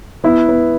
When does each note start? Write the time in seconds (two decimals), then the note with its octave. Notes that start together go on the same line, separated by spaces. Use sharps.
0.24 B3 E4
0.49 B3